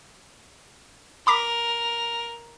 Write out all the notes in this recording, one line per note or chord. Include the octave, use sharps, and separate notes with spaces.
A#4 B5 D6 B6